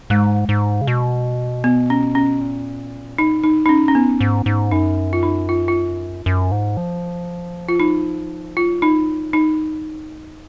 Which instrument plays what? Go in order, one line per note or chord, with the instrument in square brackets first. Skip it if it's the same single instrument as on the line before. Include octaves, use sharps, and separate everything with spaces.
[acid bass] G#2 [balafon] G#3
[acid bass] G#2
C#3
B2
[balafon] B3
C#4
C#4
[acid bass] A#2
[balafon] D#4
D#4
D#4
C#4
C#4
[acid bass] F#2 [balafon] B3
[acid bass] G#2
G#2
[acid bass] F#2 [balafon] D#4
[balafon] F4
D#4
F4
F4
[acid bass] F#2
G#2
F3
[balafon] F4
D#4
[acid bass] F#3 [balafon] F4
[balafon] D#4
D#4
[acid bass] G#3